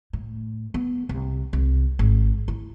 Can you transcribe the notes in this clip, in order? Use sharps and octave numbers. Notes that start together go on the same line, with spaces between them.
A2
B3
C2
C2
G#1
E4